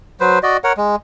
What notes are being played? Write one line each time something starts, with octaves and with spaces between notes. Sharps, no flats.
F#3 B4 C5
F#4 D5 D#5
A#4 C#5 F#5
G#3